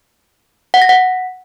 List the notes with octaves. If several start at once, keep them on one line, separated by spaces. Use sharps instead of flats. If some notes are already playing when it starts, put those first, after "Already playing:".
F#5
A#6
F#5